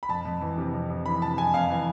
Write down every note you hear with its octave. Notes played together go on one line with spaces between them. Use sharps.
B5
F2 A5
F2
E3
C3
F2
F2
E3 B5
C3 A5
F2 G#5
F2 F5
E3